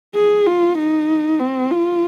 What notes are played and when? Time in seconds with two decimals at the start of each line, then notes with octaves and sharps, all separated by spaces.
0.15 G#4
0.46 F4
0.78 D#4
1.39 C4
1.71 F4